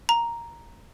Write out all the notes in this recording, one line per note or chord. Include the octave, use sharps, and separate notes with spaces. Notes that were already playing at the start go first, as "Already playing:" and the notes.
A#5